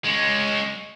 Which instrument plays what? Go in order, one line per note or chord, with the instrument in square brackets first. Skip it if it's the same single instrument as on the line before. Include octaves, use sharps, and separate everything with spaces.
[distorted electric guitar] G#3 C#4